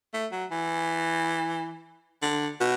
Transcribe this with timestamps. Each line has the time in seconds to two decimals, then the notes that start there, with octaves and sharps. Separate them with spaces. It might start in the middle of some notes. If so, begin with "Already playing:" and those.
0.13 A3
0.32 F#3
0.51 E3
2.22 D3
2.60 B2